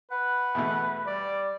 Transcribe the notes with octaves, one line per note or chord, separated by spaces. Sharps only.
B4 F#5
E2 B2 A3
G3 D5